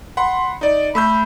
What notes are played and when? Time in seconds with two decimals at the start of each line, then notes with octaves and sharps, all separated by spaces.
0.17 F#5 B5 C6
0.61 D#4 D5
0.95 A3 B5 E6 G6